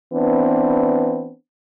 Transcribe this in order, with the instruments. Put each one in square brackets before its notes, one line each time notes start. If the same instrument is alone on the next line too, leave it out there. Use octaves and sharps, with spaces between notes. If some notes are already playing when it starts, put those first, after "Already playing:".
[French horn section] E3 B3 C4 D4